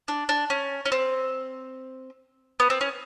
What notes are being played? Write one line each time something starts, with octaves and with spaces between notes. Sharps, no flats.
D4
D4
C#4
C#4
C4
B3
C4
C#4